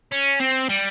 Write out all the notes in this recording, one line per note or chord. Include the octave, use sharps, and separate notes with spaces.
C#4
C4
G3